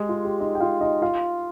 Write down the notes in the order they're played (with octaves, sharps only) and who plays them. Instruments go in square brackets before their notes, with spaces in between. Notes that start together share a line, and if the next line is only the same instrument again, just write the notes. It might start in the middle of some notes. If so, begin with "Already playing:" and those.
Already playing: [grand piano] G#3 G4 G#4
F4
G4
D#4 D#5
G5
F4 F5
D#4 D#5
F4 F5